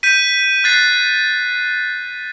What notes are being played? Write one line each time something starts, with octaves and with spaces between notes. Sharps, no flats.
G6 B6 D#7
F#6 A6 C7